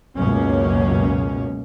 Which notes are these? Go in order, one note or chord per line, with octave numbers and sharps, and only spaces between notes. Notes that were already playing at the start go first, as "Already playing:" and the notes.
C#2 F#2 B2 A#3 C#4